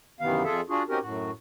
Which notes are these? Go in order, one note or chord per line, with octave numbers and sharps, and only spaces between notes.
F#2 C3 D#3 E3 B3 F5
F2 F4 G#4 A4 E5
D4 F4 F#4 G#4
C4 C#4 D#4 F#4 G4 A#4
F#2 A2 F#4